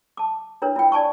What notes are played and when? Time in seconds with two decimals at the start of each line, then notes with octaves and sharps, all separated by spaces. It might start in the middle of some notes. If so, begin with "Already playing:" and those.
0.17 A5 D6
0.62 D4 E4 A#4 B4 C#5
0.76 E4 F4 G5
0.92 D5 G#5 A5 C#6